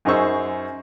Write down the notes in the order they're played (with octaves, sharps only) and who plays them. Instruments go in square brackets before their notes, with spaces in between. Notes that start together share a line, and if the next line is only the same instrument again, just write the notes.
[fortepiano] F#2 D#4 G#4 C5 C#6 E6